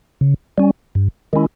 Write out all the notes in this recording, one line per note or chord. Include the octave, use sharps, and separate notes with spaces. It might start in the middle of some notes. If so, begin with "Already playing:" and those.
C#3
G3 C#4
G2
D#3 G#3 C#4 E4